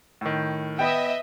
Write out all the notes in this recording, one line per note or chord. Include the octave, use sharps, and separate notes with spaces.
A2 D#3
B3 D#5 E5 G5